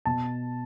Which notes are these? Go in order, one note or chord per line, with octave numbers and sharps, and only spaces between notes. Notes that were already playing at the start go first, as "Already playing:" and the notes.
B2 A5